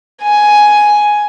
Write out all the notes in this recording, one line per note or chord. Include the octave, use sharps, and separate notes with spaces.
G#5